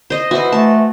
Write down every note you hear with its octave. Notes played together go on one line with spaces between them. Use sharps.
C5 D#5
E3 F#4 D#5
A3 A5